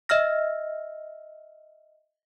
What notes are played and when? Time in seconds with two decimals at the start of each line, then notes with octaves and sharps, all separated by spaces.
0.09 D#5 E5 E6 F6 A#6